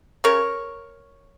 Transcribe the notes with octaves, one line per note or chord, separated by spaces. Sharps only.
C#3 A#4 C#5